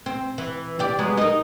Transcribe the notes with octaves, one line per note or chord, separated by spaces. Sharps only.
C4
E3
D4 G4 D5
F#3 G#3 B3
D#4 A#4